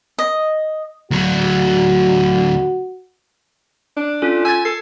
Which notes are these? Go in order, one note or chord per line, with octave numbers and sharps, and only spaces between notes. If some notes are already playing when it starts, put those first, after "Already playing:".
D#5
D2 F#3 F#4
D4
C#4 F4 A4
G#5 E6 G#6 A6
A4 C7